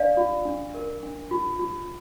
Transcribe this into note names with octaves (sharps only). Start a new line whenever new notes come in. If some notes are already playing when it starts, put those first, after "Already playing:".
Already playing: D4 D5 F5
F4
D4
A#4
D4
F4
F4